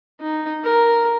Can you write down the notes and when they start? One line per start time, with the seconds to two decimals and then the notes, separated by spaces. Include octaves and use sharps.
0.21 D#4
0.64 A#4